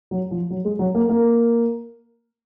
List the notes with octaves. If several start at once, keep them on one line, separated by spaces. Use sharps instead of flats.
F#3
F3
F#3
G#3
F#3
A#3
A#3